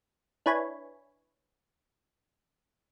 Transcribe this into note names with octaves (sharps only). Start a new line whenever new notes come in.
D4 E4 B4 C#5 G#5 B5